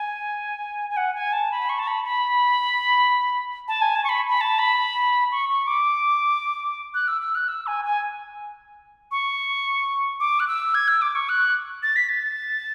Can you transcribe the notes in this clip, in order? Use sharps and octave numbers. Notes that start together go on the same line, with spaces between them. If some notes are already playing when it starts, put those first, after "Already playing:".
Already playing: G#5
G#5
F#5
G#5
A5
B5
C#6
A5
B5
B5
A5
G#5
A5
C#6
B5
B5
A5
B5
C#6
C#6
D6
F#6
E6
E6
F#6
E6
G#5
G#5
C#6
D6
F#6
E6
G#6
E6
D6
C#6
F#6
A6
B6
A6